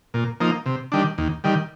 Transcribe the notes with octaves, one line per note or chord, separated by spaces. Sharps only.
A#2
F3 A#3 D#4
C3
D#3 G3 D4
D#2
D#3 G3